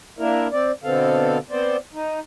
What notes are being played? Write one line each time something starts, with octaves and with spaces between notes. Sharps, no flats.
A#3 D4 E4 A#4
C4 D5
B2 D3 B3 C4 A4 F5
B3 C4 C5 D5
D#4